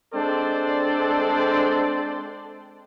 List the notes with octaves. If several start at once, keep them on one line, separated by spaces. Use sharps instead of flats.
G#3 C4 D4 A4 C5 D5